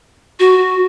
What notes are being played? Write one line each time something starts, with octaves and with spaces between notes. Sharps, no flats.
F#4